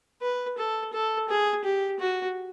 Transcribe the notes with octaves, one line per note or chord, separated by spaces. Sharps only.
B4
A4
A4
G#4
G4
F#4